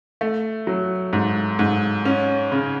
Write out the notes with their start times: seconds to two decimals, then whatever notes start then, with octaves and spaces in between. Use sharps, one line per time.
0.21 A3
0.67 F#3
1.13 G#2
1.59 G#2
2.05 C#4
2.52 C#3